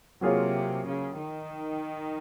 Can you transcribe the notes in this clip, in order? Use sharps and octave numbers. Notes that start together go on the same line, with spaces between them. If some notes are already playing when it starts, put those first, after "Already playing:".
C3 F#3 A#3 F4 G#4 C#5
C#3
D#3